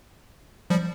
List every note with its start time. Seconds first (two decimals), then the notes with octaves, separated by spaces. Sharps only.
0.70 F3 G3